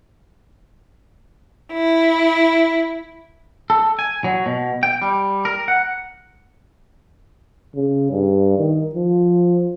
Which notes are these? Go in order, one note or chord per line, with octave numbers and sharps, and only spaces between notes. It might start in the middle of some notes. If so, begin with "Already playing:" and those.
E4
A4
G#5
F#3
B2
G5
G3
A#4
F#5
C#3
G2
D#3
F3